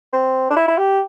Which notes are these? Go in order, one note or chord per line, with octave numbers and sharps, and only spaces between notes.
C4
D4
E4
E4
G4